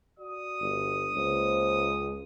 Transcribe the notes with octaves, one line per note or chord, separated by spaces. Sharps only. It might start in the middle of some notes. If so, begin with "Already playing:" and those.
F#4 D5 D#6
G1
C#2 A#3 C5